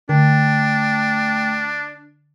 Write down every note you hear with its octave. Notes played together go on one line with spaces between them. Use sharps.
D3 A3 D4 G5